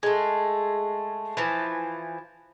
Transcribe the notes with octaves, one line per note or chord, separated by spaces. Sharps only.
G#3 A3
E3 F3